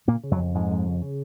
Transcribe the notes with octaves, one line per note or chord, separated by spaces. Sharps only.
A#2 C#3 A#3
C#3
F#2 F#3
F2
F2 G#2 G#3
F2
C#3
C#3